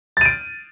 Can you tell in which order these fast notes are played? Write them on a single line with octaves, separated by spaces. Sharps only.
A6 D#7 D7